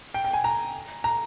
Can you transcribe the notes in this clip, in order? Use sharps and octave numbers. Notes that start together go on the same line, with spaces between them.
G5
G5
G#5
A#5
A#5